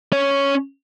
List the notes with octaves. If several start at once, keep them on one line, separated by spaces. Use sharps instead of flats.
C#4 C#5